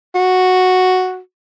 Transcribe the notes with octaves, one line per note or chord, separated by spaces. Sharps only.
F#4